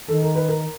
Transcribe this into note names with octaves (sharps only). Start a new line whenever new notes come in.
D#3 A4
A#4
B4
A#4